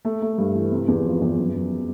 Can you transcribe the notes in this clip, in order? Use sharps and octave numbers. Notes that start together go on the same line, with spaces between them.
A3
A3
G2
E3
C3
E2
F3
E2
F#2
F#2